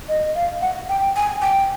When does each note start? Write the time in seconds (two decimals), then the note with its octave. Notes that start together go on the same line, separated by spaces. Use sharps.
0.09 D#5
0.35 F5
0.62 F#5
0.89 G5
1.16 G#5
1.42 G5